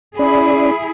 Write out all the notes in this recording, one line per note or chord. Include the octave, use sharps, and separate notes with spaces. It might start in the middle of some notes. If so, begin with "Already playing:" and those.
C#4 E4 G#4 D5 B5